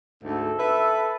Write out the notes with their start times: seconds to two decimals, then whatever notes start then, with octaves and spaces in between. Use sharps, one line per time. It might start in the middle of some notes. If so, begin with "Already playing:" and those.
0.24 D2 G#2 A4
0.59 B4 E5